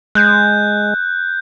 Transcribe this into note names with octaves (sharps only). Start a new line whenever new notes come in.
G#3 F#6 G6